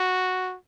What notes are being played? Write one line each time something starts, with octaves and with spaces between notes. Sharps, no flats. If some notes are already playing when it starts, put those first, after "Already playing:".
Already playing: F#4